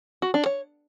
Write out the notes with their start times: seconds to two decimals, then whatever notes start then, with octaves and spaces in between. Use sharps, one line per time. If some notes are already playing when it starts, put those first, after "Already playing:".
0.22 F#4
0.34 D4
0.46 C#5